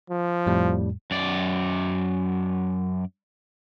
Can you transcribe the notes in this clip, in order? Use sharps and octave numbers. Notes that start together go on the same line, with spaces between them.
F3
F2 A2 G3
F#2 D5